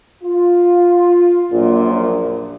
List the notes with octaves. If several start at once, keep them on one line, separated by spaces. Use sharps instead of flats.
F4
A#1 F#2 A#2